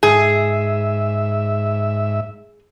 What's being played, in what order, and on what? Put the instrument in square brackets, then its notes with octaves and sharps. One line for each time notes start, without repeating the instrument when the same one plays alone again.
[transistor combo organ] G#2 E5 [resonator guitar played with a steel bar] G#4